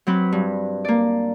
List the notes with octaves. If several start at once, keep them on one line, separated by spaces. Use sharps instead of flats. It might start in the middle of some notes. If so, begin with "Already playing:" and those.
F#3 C4 B4
G2
A#3 D5